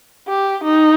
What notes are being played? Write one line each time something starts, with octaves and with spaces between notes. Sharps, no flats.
G4
D#4